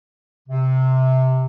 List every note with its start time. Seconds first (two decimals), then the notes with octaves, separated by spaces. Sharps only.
0.48 C3